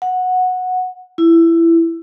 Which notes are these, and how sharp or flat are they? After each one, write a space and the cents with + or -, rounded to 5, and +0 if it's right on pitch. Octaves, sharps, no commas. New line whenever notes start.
F#5 -10
E4 +15